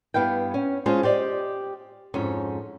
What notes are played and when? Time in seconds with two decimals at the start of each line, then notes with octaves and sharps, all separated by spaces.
0.14 G2 B3 E4 F5 G5
0.54 C#4
0.86 G#3 C#4 F4 C5 A5
1.03 G4 C5 D5 D#5
2.14 F2 G#2 C#4